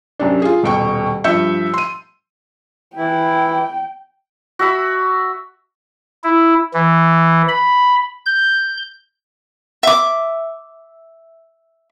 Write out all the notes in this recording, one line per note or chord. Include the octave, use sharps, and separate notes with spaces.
F#2 C3 D4
F4 G#4
D#1 B2 G5 C#6
G2 F3 E5 E6 G6 C#7
C6 D#7
E3 E4 G5
F#4 E5 B5
E4
E3
B5
G6
E5 D6